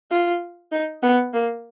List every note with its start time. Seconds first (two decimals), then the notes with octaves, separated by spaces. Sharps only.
0.11 F4
0.72 D#4
1.02 B3
1.33 A#3